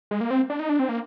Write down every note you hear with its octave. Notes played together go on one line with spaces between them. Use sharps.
G#3
A#3
C4
D4
D#4
D4
C4
A#3